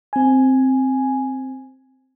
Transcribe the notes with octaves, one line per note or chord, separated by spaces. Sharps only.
C4 G#5